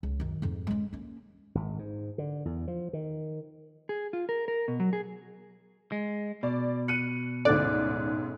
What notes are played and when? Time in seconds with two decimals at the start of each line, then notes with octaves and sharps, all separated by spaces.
0.03 C#2
0.20 F#2 D#3
0.42 F2 G#2
0.67 G#3 C#4
0.93 A#3 C#4
1.55 G#1
1.79 G#2
2.18 D3
2.45 E2
2.68 F3
2.93 D#3
3.89 G#4
4.13 F4
4.29 A#4
4.48 A#4
4.68 B2
4.80 F#3
4.93 G#4
5.92 G#3
6.43 B2 D5
6.88 F#6 C#7 D#7
7.45 A1 D2 G#2 A4 D5 F#6